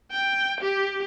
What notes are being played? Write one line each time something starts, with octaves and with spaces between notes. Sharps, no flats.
G5
G4